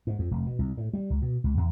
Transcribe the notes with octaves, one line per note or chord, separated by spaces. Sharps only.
G#2
F2
F1
B2
C2
A2
G3
C#2
B2
C#2
E2